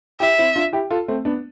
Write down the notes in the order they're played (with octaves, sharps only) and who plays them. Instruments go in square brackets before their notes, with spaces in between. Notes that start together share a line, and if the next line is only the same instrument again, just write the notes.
[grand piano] E4 G4 [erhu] E5
[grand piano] C4 E4
D4 F4
E4 G4
F4 A4
A3 C4
B3 D4